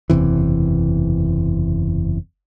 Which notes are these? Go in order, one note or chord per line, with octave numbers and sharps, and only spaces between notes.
F#1 E2 C3 E3